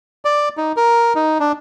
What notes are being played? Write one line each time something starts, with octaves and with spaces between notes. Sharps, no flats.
D5
D#4
A#4
D#4
D4